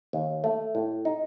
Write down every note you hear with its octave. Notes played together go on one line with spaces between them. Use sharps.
D#2
A3
A2
D#4